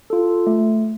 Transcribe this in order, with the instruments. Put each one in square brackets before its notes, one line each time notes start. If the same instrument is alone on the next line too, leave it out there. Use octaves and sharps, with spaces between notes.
[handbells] F4 A4
A3